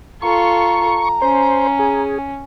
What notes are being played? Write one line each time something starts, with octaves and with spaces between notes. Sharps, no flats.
F4 A4 A#5 C#6
C#4 C5
G#4